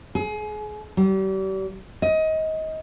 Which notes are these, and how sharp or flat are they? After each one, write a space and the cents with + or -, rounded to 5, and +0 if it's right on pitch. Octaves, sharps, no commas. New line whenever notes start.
G#4 +30
G3 -40
D#5 +20